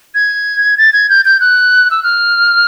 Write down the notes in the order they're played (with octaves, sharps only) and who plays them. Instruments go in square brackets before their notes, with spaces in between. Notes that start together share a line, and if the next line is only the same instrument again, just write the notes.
[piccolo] G#6
A6
G#6
G6
G6
F#6
E6
F6